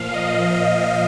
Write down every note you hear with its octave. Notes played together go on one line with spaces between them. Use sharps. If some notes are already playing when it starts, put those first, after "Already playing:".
Already playing: A#2 F3 F5
D#5
F5